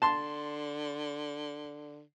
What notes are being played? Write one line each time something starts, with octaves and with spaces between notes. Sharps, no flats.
D3 A5 C6